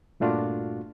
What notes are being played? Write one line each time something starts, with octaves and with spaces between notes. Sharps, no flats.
G2 A#2 A3 D4 F4 F#4